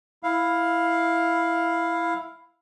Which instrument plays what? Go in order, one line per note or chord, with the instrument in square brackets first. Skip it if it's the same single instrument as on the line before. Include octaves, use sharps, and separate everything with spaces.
[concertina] E4 F5